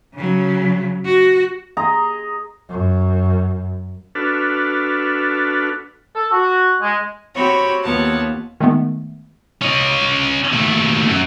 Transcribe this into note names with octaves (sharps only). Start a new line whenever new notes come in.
C#3 F#3
F#4
G#4 D#5 A#5 C6
F#2
D4 F#4 A4 B4 F6
A4
F#4
G#3
C4 F#4 G4 C#5 B5
D#2 B3 F4 C#5 F#5 A5
D#3 G#3 A3 B3
C#4 D#5
D#2 A3
F#2